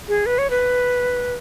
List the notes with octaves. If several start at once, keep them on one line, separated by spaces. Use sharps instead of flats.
G#4
B4
C#5
B4